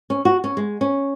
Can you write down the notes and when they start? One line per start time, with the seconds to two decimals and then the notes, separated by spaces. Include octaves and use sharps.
0.10 C#4
0.25 F#4
0.44 C#4
0.57 G#3
0.81 C#4